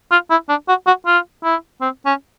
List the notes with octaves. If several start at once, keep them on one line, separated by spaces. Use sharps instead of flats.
F4
E4
D4
F#4
F#4
F4
E4
C4
C#4